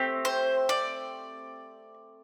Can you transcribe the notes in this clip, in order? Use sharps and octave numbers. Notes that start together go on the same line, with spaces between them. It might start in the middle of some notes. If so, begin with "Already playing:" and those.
Already playing: A3 C4 G4
C5
D5